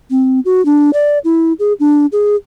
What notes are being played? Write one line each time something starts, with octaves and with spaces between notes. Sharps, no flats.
C4
F#4
D4
D5
E4
G#4
D4
G#4